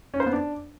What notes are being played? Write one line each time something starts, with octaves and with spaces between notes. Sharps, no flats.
C#4
C5
B3
D4